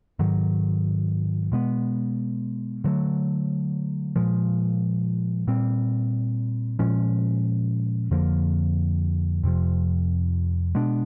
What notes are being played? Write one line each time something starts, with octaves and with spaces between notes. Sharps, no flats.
G#2 D#3 F#3
B2 G#3 B3
D3 F#3 A3
A#2 F3 G#3
A#2 G3 C4
A#2 F3 G#3 C#4
F2 D3 F3 A#3
F2 C3 F3
B2 G#3 B3 D4